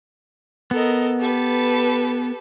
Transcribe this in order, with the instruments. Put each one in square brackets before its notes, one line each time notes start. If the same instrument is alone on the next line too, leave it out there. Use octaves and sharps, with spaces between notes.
[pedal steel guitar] B3 [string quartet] A4 A#4 D#5
[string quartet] G4 A4 B4